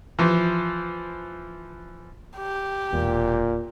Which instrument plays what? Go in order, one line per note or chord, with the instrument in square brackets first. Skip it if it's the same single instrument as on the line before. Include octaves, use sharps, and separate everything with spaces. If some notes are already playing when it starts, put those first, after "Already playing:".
[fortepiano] E3 F3
[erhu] G4
[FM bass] E1 [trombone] A#2